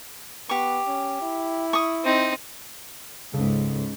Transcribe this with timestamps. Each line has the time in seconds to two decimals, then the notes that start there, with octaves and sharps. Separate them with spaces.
0.49 B3 G4 C#6
0.87 C#4
1.21 E4
1.73 C#6 D#6
2.04 C4 D#4
3.34 C#2 G#2 C#3 A4